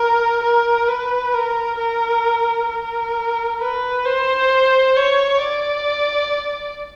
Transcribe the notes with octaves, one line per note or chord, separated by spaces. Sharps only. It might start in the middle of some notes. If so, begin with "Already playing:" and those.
Already playing: A#4
A#4
B4
A#4
A#4
A#4
B4
C5
C#5
D5